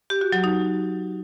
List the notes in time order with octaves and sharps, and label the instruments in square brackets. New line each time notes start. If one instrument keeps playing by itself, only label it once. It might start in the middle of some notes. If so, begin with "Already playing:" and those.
[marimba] G4
F#4
F#3
D#4